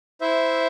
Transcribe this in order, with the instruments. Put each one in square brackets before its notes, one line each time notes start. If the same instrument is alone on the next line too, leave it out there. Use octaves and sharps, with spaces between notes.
[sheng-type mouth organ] E4 C5 E5